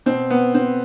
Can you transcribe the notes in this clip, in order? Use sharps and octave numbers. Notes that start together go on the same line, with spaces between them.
B2 C4
B3
C4